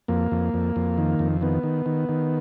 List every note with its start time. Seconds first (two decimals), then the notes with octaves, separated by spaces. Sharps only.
0.08 F2 A#3
0.31 F2
0.54 F2
0.76 F2
0.98 D#3
1.19 F2
1.41 D#3 B3
1.63 D#3
1.86 D#3
2.09 D#3